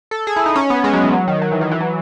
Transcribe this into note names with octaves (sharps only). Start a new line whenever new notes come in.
A4
G#4
E4
D#4
C#4
B3
G#3
F#3
E3
F#3
D#3
F#3
E3
D#3
E3
F#3